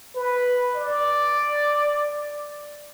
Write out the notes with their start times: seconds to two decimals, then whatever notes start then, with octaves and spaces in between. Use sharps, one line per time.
0.15 B4
0.76 D5